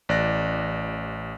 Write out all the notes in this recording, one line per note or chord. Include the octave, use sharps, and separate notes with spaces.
A1 D5 F#6 A#6